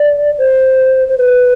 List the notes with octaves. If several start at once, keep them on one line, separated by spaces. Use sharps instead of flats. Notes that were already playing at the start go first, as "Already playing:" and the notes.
Already playing: D5
C5
C5
B4